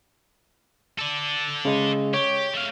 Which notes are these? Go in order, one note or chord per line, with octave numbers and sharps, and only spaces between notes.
A4 D5
C#3 G#3
G4 C#5
A3 F5